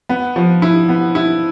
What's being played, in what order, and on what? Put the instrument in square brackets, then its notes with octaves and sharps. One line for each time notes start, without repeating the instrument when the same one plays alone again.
[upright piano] B3
F3
E4
B3
E4